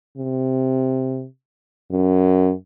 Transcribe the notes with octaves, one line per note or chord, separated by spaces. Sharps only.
C3
F#2